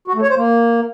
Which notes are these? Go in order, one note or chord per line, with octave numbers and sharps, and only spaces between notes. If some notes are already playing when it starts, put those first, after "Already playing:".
F#4
A3
C#5
C5
A#3